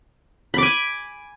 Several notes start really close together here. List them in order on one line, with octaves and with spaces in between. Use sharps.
B5 D6 G#5